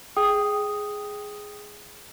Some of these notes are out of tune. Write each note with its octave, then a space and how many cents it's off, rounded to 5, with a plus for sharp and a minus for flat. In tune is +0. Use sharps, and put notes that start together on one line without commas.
G#4 +0 G5 +0 D#6 +0